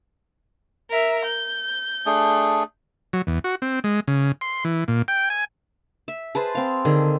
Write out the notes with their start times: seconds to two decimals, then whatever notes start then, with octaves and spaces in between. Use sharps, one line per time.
0.90 A#4 E5
1.25 G6
2.06 A3 D4 G#4
3.13 F#3
3.27 E2
3.44 F#4
3.62 C4
3.84 G#3
4.08 C#3
4.41 C6
4.65 E3
4.88 A#2
5.08 G5
5.30 G#5
6.08 E5
6.35 G#4 B4 C5 A5
6.55 C4 F5
6.85 D3 D#3 G#4